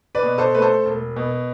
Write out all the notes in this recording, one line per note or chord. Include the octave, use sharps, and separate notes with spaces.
B4 D5
B2
A4 C5
A3 B4
A4 C5
E1
B2